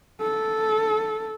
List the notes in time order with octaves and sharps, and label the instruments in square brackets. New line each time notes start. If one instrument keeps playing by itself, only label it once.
[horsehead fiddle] A4